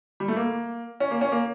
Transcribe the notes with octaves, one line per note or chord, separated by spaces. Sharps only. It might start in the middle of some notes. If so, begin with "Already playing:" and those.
G3
A3
A#3
C#4
A#3
C#4
A#3